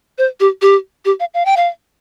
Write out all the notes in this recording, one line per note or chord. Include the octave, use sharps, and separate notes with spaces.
C5
G4
G4
G4
F5
F5
G5
F5